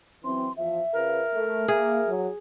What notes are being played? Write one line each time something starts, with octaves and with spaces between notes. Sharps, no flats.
E3 F#3 C4 C6
E2 F3 E5
C#3 F4 A#4 B4
A3
A#3 G#4 E5
F#3